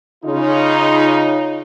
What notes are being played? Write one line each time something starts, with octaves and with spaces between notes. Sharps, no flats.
C#3 D#4 F4